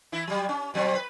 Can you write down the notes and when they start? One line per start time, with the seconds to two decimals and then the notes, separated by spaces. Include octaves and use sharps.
0.12 E3 E4
0.27 F#3 G3
0.49 C#4
0.74 B2 F#3 C4
0.95 B4